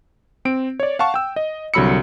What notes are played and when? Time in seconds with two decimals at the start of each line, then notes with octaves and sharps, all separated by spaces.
0.45 C4 D7
0.80 C#5 D5
0.99 F5 F#5 A5 C#6
1.14 G5 E6
1.36 D#5
1.74 C2 D3 F#3 B5 E6 C#7